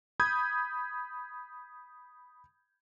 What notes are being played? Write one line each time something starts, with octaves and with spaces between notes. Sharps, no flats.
B5 D#6 G6 G#6